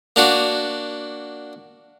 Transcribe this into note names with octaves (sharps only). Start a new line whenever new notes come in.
A#3 D4 F#4